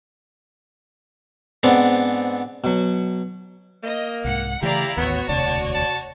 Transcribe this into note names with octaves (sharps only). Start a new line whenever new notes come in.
G#2 B3 C4 D4
B2 F#3
A#3 D#5
C2 G#2 F#5 C#7
C#3 E3 A3 E4 G4 D5 F5 A#5
A1 D#2 B3 F#4 C#5
E1 D2 C3 D5 A5
A5